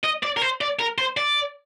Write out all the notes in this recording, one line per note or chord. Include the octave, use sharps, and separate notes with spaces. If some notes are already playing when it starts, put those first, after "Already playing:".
D#5
D5
A#4
C5
D5
A#4
C5
D5